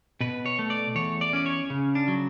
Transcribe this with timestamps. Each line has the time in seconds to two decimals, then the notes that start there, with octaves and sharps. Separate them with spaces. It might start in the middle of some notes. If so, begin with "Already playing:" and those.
0.21 B2 B4
0.46 C#5
0.59 A3
0.70 D5
0.95 E2 C#5
1.21 D5
1.33 C#4 D5
1.46 C#5
1.70 C#3
1.95 D4
2.08 F#3